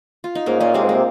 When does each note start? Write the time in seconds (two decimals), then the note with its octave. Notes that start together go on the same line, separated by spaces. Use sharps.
0.24 F4
0.35 D#4
0.46 G#2 A#3 C#4
0.60 A#2 A#3 C#4
0.74 C3 G#3 C4
0.84 G#2
0.89 A#3
0.94 C3